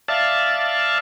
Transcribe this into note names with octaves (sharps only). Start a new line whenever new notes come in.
D5 E5 F5 A5